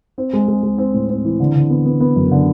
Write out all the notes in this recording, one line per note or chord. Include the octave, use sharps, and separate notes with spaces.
C4
G#3
G#3
G#3
C4
A2
C4
E3
D3
D3
B3
B3
B3
F#2
D3